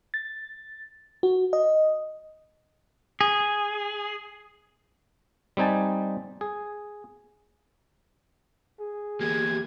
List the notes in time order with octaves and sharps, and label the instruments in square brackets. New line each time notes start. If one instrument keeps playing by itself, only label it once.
[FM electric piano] A6
F#4
D#5
[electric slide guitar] G#4
[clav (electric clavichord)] G3 C4 D#4 G#5 A5
G#4
[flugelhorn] G#4
[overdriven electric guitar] E2 A#3 [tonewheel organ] G4 [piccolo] G#6